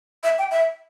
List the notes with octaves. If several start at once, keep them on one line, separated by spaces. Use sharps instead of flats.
E5
G5
E5